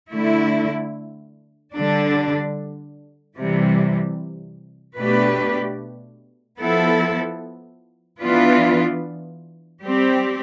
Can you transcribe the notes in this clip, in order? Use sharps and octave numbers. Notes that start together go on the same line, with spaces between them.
D3 A3 E4
D3 G3 D4
C3 E3 G3
B2 A3 D4 G4 B4
F3 B3 E4 A4
E3 B3 D4 F4 B4
G3 C4 G4